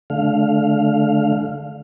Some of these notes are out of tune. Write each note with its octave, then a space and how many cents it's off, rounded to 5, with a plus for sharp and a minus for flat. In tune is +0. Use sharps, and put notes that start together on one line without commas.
D3 +0 A3 -35 F5 +0